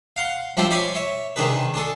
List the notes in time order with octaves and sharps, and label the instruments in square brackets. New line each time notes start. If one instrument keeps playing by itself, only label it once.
[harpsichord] F5 F#5 C6
F3 G3 C4 D4 E4 F4
C#5 D5 G#5 B5 C6 D6
C#5 E5
C3 D#3 D4 G#4 B4
D4 G#4 A4